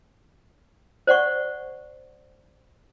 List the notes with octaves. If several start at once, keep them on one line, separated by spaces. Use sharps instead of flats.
C5 D5 F#5 C#6